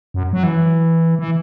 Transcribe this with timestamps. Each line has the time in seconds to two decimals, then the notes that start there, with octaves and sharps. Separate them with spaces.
0.14 F#2
0.33 F#3
0.43 E3
1.19 E3